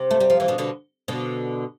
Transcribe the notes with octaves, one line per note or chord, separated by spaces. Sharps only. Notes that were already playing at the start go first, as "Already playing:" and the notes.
Already playing: C3
A3
G3
F3
E3
B2 D3
B2 D3
B2 D3